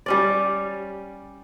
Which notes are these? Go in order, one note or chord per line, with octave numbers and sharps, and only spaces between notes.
G3 C#4 D5